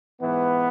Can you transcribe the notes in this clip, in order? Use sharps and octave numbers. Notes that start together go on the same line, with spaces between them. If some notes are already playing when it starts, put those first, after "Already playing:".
G#2 E3 B3